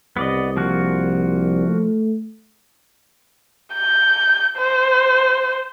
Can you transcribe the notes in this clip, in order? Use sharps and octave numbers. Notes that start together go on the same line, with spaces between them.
C2 B3 D5 D#5
F3 A#3 F#4
A3
G6
C5